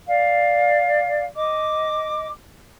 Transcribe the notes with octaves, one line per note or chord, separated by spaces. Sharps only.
D5 F5
D#5 D6